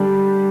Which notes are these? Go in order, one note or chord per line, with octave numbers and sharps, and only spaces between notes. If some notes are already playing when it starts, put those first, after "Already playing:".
Already playing: D3 G3 D4 G4